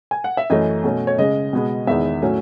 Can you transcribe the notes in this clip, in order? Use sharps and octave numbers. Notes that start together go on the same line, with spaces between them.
G#5
F#5
E5
F#2 E3 A3 C#4 D#5
B2 F#3 A3 C#4
C#5
C#3 G#3 C#4 D#5
B2 G#3 B3
E2 D#3 G#3 B3 E5
A2 F#3 C#4